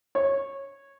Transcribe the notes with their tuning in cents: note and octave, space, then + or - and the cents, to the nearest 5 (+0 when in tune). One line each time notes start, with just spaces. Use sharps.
C#5 -15